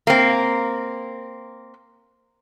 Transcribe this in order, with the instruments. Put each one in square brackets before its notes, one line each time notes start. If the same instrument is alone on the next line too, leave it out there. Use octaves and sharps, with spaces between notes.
[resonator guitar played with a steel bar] A#3 C4